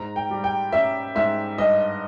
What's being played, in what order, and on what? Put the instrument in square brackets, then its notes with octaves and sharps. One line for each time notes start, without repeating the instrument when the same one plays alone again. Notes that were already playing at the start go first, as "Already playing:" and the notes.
Already playing: [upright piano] G#2 A#5
G5
G3
G5
C#4 E5
G#2 E5
G2 D#5